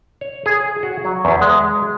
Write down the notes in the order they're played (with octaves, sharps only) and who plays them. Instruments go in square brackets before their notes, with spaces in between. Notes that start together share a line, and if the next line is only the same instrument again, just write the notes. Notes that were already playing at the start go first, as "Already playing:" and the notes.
[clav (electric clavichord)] C#5
G#4
F#4
F#3
E2
G#3